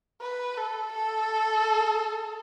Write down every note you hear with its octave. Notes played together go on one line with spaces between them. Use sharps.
B4
A4
A4